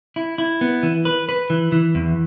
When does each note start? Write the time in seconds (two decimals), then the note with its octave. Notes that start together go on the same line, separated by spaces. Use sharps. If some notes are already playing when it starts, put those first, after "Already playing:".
0.16 E4
0.38 E4
0.61 B3
0.83 E3
1.05 B4
1.29 B4
1.50 E3
1.72 E3
1.95 E2